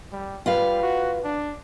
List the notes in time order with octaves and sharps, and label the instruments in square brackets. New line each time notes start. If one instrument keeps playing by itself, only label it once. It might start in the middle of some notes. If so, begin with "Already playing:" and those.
[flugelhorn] G3
[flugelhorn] G3 [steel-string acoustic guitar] F4 B4 F5
[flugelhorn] F#4
D4